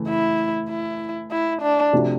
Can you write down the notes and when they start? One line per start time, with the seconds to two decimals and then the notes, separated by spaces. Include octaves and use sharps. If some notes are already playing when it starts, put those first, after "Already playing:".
Already playing: C#3 E3 A3
0.08 E4
0.69 E4
1.31 E4
1.62 D4
1.93 C3 F3 A3 D4 F#4